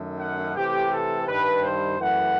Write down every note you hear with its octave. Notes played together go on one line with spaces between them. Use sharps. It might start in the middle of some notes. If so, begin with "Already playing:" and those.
Already playing: F#2 D#3 A3
F#5
C3 E3 A3 G4
A4
G2 D#3 G3 B4
C5
F#2 E3 A3 F#5